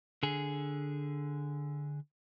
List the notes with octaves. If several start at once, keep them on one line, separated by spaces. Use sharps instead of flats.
D3 G#4